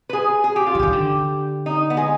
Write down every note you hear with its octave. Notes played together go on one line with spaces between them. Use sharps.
B4
G#4
G#4
G4
F4
D3
D#3 G4
D3
D#4
B3
G#3